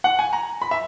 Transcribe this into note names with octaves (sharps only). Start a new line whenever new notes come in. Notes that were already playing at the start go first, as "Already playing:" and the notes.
F#5
G#5
A#5
B5
E5